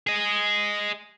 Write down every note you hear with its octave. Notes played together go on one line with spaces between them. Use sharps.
G#4 D#5